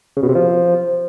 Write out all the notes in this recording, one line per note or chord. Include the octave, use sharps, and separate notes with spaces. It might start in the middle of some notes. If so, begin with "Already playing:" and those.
C#3
B2
C3
F3